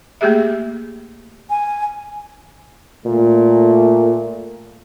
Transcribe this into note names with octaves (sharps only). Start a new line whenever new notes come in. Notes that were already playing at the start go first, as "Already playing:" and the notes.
A3 A#3 G4 G#4 E5
G#5
A#2 A3